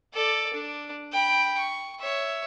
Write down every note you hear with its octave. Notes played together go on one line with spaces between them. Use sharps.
A4 D5
D4
G5 B5
C#6
C#5 E5